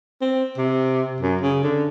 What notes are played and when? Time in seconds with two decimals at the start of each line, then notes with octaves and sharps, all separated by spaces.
0.22 C4
0.58 C3
1.21 F#2
1.41 C#3
1.63 D3